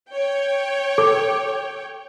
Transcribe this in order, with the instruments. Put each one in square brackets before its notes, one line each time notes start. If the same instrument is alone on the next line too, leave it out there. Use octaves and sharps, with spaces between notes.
[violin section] C#5 G5
[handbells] A4 D6